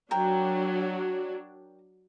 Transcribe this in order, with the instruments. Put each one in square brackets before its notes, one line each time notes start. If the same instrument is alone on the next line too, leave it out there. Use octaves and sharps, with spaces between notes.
[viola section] F#3 D4 [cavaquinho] A#4 G5